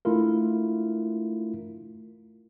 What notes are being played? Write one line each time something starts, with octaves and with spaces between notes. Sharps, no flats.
A3 D4 E4 F4 A#4